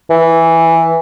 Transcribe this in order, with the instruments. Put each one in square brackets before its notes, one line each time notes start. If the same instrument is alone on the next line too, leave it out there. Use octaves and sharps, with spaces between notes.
[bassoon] E3